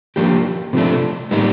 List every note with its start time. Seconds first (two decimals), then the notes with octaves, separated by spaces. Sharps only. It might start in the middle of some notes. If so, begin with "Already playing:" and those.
0.16 F3 A#3 D4 G4
0.73 C3 F3 A3 D4
1.31 A2 G3 A#3 D#4